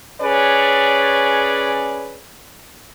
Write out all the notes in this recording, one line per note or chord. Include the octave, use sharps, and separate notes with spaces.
C#4 G#4 B4 C#5 D5